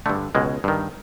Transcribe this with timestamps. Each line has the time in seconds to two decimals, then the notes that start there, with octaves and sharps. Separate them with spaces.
0.06 G2 D3 A3
0.35 C#2 B2 G#3
0.64 G2 D#3